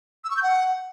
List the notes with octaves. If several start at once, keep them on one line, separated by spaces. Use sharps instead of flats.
E6
C#6
G6
F#5